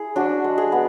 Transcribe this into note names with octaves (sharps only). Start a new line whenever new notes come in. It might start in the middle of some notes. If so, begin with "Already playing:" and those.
Already playing: E4 G#4
D4 F#4
G#3
G#4
B3